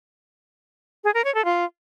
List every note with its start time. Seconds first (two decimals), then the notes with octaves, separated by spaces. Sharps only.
1.04 G#4
1.14 A#4
1.24 C#5
1.35 A4
1.45 F4